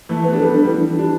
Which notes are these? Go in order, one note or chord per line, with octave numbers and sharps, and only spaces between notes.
E3 A3
B3 B4
D4 G4
G3 B3 A4
D4
G3
E3 E4
E4
D4 G4